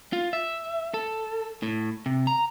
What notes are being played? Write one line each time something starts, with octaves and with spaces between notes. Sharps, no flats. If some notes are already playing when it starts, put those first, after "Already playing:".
F4
E5
A4
A2
C3
A#5